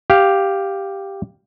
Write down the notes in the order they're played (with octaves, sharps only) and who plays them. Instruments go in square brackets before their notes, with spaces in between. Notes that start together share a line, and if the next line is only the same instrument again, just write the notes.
[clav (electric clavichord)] G4 F5